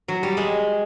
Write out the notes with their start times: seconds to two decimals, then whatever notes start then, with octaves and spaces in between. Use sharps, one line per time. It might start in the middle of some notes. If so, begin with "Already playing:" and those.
0.08 F#3
0.23 G3
0.37 G#3